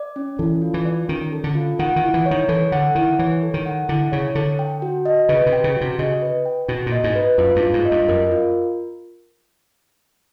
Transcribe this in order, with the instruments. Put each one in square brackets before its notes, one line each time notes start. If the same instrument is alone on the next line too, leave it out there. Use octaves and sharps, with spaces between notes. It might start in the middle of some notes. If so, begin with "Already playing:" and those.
Already playing: [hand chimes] D5
C#4
[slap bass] E3 [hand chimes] A4
[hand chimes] F4
[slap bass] E3
[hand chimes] D5
[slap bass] D#3 [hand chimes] C#4
[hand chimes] A4
[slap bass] D3
[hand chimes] F4
[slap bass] D#3 [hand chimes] F#5
[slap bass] D#3
[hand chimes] E4
[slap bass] E3
[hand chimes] C#5
[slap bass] D#3
[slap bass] E3 [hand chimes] A4
[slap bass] D3 [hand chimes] F#5
[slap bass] D#3 [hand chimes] E4
[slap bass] E3 [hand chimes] C#5
[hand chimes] A4
[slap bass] D#3
[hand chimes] F#5
[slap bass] D3 [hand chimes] E4
[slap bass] C#3 [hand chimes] C#5
[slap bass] D3 [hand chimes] A4
[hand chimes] G5
F#4
D#5
[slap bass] C#3 [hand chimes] B4
[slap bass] C3
[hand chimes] G5
[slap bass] C#3
[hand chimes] F#4
[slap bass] C3
[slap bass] C#3 [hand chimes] D#5
[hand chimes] B4
G5
[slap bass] B2 [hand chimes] F#4
[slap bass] A#2
[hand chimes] D#5
[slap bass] G#2
[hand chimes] B4
[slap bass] F#2 [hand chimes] F4
[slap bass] G2
[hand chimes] F4
[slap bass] G#2
[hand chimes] D#5
[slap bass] G2
[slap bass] F#2 [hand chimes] A#4
[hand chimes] F4